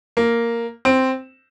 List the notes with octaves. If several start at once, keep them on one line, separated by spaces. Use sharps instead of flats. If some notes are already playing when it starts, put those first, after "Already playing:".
A#3
C4